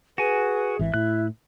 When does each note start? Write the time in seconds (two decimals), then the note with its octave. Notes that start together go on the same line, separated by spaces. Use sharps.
0.18 F#4 G#4 B4 G#5
0.79 G#1 E3 E5
0.94 A2 E4 F#6